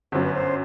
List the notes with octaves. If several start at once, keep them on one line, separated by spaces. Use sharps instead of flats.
G1 F#2 F#3 C5
B4
C5